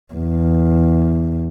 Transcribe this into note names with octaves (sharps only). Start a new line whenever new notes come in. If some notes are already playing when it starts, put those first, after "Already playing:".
E2